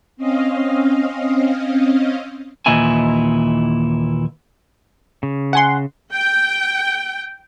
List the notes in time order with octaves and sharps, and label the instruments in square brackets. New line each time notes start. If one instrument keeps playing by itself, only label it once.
[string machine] C4 C#4 D#5 F5
[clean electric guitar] D#2 A#2 E3 D#4 E4 G#5
[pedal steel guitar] C#3
[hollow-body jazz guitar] E5 G#5 [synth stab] F#5 C6
[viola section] G5